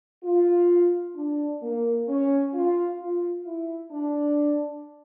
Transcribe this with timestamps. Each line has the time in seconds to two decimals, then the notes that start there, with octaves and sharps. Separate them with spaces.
0.24 F4
1.16 D4
1.62 A#3
2.07 C#4
2.54 F4
3.00 F4
3.46 E4
3.92 D4